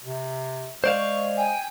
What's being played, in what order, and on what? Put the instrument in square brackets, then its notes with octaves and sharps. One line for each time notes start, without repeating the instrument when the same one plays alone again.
[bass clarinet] C3
[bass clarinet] G#3 [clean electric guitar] C5 D5 F5 [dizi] C#6
[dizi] G5 [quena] G#5